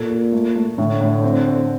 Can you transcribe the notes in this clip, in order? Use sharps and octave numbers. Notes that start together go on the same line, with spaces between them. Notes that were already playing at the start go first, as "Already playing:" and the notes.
Already playing: A#2 A4
A4
A3
A3
A2 D3
A2
C4
C4